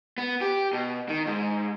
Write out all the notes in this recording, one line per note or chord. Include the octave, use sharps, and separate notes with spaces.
B3
G4
B2
D#3
G#2